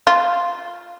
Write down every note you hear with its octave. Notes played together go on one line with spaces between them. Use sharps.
F4